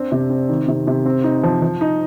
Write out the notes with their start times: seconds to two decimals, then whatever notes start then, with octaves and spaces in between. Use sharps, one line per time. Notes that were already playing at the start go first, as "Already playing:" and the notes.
Already playing: C4 D4
0.12 C3
0.30 C4
0.49 D#3
0.68 C3
0.87 C3
1.05 C4
1.24 D#4
1.44 F3
1.62 F3
1.81 D#4